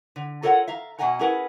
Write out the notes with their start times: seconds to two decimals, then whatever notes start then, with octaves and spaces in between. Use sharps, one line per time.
0.16 D3
0.43 F4 A4 A#4 C#5 D#5 F#5
0.68 E5 F5 A#5
0.99 B2 G3 D#5 F#5 G#5 A#5
1.19 C#4 E4 G#4 A#4 B4 F#5